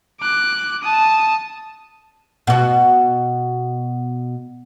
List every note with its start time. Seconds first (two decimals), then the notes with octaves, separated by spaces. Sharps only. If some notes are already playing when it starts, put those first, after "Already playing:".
0.20 D6 F#6
0.83 A5 D#6
2.47 B2 F#4